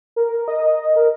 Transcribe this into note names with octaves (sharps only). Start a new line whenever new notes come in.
A#4
D#5
A#4